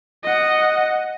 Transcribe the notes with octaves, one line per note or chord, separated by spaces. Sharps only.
D#5 F#5